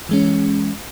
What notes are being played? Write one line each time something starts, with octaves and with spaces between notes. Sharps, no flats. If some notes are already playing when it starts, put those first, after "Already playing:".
E3 G#3 C#4